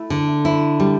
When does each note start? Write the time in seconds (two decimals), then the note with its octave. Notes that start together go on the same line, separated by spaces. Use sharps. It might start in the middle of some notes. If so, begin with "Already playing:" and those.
Already playing: A3 E4
0.10 D3
0.45 E4
0.80 G3